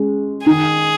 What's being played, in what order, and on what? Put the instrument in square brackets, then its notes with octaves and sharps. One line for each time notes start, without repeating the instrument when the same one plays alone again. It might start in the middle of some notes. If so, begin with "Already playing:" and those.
Already playing: [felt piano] G#3 C#4
[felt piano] D#3 D#4 [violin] G#4